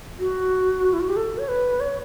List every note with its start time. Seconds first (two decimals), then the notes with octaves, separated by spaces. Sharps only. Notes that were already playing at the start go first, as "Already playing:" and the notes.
0.19 F#4
0.93 E4
1.00 F#4
1.09 G4
1.16 A4
1.38 C#5
1.48 B4
1.80 C#5